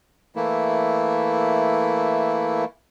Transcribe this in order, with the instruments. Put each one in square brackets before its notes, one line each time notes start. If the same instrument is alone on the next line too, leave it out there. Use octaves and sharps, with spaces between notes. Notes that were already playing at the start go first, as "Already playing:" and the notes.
[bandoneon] E3 A3 A#3 E4